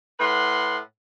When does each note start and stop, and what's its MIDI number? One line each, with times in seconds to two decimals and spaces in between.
0.19 0.78 45
0.19 0.78 71
0.19 0.78 78
0.19 0.78 84